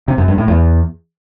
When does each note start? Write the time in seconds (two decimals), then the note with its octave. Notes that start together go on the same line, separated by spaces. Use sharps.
0.08 C3
0.18 F#2
0.28 G2
0.38 A2
0.48 E2